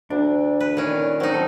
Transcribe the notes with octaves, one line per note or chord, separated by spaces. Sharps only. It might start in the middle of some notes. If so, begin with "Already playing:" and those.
D2 D4
B4
A#2 D#3 C#4
F#3 C4 D#4
A4